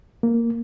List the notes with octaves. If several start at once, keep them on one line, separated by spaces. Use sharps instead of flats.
A#3